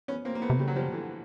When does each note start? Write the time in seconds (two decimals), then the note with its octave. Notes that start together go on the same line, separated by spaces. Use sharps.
0.08 B3 C#4
0.25 A#3 C4
0.35 A#3
0.42 A3 B3
0.50 C3
0.59 C#3 G3 A3
0.68 F#3
0.76 F3 G3
0.92 D3 E3